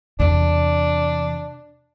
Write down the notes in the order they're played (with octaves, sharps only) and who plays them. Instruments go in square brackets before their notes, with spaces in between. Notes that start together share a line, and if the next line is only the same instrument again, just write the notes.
[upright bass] E2 C3 [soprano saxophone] D4